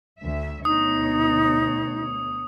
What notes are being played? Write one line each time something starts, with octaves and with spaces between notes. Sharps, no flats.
D2 E5
D2 B2 D#4 C#5 D#6